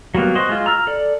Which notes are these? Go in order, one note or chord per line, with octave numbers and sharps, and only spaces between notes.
F#3 G3 A#3 B3
F#4 C5 D#5
G#3 F4
A#5 E6 F6
A4 D5